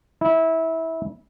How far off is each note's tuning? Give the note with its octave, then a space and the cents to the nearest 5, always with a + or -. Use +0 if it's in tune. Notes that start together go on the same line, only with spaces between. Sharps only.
E4 -20